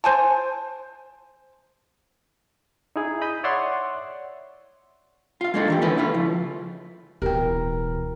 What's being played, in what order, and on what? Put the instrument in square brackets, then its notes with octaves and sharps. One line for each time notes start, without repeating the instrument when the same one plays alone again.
[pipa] C5 G#5 A5
[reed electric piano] D#4 E4 G#4
D#5 B5 D#6 G6
C#5 D5 E5 F#5 C6 C#6
[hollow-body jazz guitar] F4 F5
G#3 A#3 D4 D#4 A4
D#2 E3 G4
D3 A#3 C#4 E4 B4
A3 E4 F4
C#3 F3
[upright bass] D1 [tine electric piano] B2 E3 [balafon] G4 G5 [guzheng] A#4